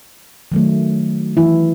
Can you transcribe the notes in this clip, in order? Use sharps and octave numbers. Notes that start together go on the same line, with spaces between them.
D#3 F#3 A3
E3 E4